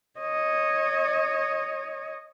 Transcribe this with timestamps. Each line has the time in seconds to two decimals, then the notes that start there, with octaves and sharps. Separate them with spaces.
0.20 C#5 D#5